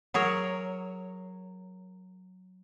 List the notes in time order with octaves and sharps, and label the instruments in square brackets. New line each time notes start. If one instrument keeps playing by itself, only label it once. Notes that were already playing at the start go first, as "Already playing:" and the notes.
[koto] F#3 G#4 A#4 C#5